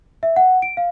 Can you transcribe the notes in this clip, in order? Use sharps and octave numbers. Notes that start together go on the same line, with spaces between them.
E5
F#5
D7
F5